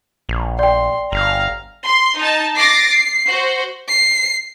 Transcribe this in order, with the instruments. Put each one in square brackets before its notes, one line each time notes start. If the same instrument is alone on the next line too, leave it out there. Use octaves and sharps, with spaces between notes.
[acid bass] A#1
[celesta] D5 G5 [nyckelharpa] C6
[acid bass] G1 [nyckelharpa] F5 A#5
[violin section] C6
D#4 A5
D6 A6 A#6 C7
C7
F#4 C5
[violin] C7